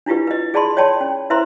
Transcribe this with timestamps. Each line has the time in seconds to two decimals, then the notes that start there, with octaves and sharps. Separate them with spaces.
0.06 D4 E4 F4 G4 B4
0.27 B4 D#5
0.54 G#4 D5 A5 B5 C6
0.77 C#5 D5 G5 A5 B5 C6
1.01 C#4
1.30 E4 B4 C5 E5 A#5 C6